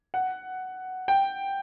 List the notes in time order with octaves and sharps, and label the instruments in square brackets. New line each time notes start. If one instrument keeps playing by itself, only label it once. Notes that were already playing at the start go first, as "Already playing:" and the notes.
[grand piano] F#5
G5